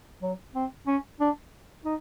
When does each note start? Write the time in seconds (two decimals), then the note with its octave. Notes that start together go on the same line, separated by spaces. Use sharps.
0.22 F#3
0.55 C4
0.87 C#4
1.20 D4
1.85 D#4